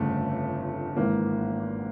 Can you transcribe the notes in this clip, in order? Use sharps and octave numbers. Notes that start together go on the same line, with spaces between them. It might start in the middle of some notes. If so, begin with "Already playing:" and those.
Already playing: G1 F2 C#3 A3
G#1 G#2 E3 A#3